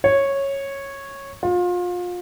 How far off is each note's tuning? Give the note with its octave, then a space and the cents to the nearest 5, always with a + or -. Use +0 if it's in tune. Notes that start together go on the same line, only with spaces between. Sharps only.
C#5 -10
F4 +30